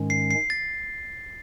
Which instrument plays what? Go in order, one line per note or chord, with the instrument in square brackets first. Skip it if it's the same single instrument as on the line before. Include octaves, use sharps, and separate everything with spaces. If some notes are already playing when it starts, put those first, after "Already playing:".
Already playing: [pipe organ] G#2 D#3 G#3 C#4
[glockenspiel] C7
C7
A6